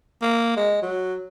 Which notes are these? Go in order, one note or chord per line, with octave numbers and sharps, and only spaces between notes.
A#3
G#3
F#3